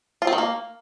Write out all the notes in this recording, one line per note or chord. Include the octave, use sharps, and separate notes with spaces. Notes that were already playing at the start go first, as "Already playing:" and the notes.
F4
C4
D#3
A#3